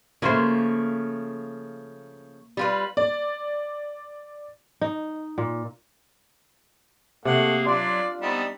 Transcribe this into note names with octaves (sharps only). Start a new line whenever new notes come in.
C#3 F3 A3 A#3 C5
G3 F4 B4
D5
D#4
A#2
C3 A3 A#3 G#4 F#5
F#3 D4 F4 D5 C6
G3 B3 C4 D#4 A5